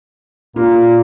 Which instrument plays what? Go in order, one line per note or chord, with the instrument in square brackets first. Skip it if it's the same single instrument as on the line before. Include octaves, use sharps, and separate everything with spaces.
[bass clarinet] A#2 [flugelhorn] A#3 [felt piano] F4